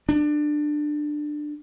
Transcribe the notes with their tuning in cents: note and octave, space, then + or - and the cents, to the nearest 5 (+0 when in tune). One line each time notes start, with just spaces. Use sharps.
D4 +20